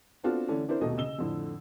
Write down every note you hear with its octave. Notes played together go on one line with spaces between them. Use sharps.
B3 C4 D4 F4 F#4 A4
D3 E3 A3 C#4 D4
C4 D4 E4 A#4 C5
D#1 B2 A3 D#5
C#3 D#5 E6 G7
F2 A2 D3